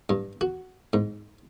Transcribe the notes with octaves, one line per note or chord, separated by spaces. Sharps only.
G2
F#4
G#2